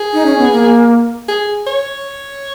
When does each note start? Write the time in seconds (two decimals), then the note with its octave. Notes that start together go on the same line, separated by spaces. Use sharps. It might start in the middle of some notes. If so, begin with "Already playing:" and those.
Already playing: G#4
0.13 D#4
0.26 C#4
0.38 B3
0.51 A#3
1.29 G#4
1.67 C#5